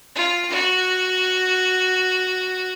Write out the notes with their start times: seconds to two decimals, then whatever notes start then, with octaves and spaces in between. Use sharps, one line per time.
0.15 F4
0.51 F#4